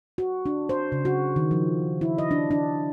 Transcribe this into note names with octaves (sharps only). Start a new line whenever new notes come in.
F#4
D4
C5
C#3
F#4
D#3
F3
E4
D#5
D4
D4